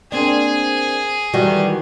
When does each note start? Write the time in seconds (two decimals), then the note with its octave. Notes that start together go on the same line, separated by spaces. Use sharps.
0.12 A#3 C4 D4 G#4
1.33 D#3 E3 G3 F#4 G4